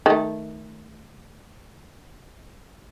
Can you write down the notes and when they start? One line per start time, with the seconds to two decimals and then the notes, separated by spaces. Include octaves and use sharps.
0.06 D#3 A3